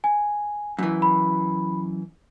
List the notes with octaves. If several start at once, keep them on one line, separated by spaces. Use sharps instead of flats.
G#5
F#2 E3
B5